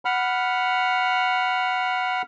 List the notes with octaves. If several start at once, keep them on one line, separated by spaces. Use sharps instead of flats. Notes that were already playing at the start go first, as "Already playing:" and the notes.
F#5 B5 F6